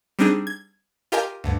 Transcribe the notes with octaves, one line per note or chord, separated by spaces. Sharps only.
G3 C4 D4 D#4 G#4
G#6
F4 G4 A#4 D#5 G#5 A#5
D2 G2